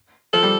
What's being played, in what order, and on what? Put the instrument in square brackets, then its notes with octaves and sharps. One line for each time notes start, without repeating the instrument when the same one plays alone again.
[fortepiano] F3 [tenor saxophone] A4
[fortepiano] G3